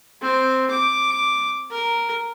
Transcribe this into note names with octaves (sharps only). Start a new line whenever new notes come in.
C4
D6
A#4